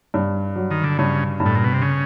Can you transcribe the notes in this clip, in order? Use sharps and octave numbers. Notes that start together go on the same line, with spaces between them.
G2
F#3
D#3
D3
G2 C#3
G2
A2
A#2
B2
C3
C#3